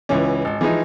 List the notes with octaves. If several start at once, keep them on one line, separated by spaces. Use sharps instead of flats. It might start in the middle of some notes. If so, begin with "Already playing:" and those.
C#2 E3 C#4
G#1
E3 F3 G#3 D#4